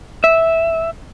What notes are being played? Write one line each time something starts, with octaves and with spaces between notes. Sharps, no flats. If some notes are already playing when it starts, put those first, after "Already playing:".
E5